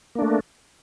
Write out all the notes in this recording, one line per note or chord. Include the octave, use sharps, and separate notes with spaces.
A3 A#3 D4